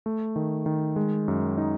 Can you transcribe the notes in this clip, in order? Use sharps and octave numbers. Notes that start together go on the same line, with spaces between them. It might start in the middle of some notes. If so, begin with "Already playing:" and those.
A3
D#3
D#3
G#3
F#2
D#4